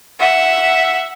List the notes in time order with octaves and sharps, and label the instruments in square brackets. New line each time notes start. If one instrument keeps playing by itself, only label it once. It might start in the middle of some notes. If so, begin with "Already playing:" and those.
[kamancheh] E5 F#5